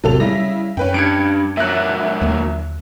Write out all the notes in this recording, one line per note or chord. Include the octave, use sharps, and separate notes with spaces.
A1 E2 C3 F#3 A4 F7
C#3 G3 E4 A#6
F#2 C#4 B4 G5
G2 G#6 C#7 D7
A#2 F#3 E5 F#6
D#2 D3 A#3